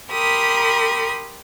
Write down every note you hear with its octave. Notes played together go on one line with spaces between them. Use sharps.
G4 A#4 B5 C6 D#6